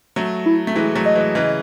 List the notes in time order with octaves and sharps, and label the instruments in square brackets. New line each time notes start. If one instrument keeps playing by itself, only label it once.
[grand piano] F#3 A3
[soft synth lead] E4
[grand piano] A3
[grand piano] E3 G#3 [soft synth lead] E4
[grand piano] F#3 A3
[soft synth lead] D#5
[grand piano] E3 G#3
C#3 E3